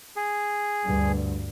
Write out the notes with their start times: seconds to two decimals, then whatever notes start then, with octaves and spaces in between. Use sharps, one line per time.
0.16 G#4
0.83 D2 G2